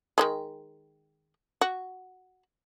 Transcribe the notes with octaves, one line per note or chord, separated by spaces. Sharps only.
D#3 F#3 G#3
F#4